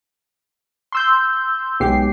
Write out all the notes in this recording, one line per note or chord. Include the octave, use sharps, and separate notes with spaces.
C6 E6 G6
B1 G#3 G4 C7